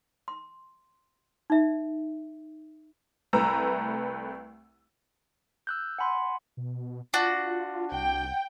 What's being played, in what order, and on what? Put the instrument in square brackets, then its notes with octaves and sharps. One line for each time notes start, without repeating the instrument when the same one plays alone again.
[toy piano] C6
D#4 E5
[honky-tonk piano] C2 A3 B4 A#5 E6
[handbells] E6 F#6 G6
F#5 G#5 B5 C6
[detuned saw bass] B2
[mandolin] D4 F#4 [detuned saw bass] F4
[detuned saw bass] C2 [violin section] G5